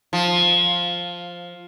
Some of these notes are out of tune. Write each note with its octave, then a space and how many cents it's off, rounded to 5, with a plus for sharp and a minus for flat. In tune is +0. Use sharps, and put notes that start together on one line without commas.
F3 +5